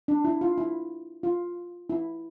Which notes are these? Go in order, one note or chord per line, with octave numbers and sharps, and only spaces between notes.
D4
E4
F4
E4
F4
E4